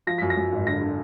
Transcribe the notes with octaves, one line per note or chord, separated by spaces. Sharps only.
F3 A#6
F#2 B6
A#6
F#2
G#1
D3 A#6
D3